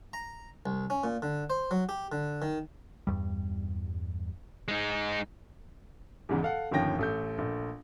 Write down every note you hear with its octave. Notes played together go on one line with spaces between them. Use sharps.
A#5
C2
C#4
A#2
D3
C5
F#3
G4
D3
D#3
E2 G2 G3
G#3 D#4
E2 G#2 C#3 E3
A4 F5 F#5
G1 D#2 F3 C#4 G5 A#6
A1 A3 G6
A#1 A3